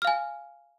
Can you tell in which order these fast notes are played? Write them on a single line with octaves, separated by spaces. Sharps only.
F6 F5 G#5